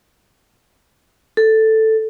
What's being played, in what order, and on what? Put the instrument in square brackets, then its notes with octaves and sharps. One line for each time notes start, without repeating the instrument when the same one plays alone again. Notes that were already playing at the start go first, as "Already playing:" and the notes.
[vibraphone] A4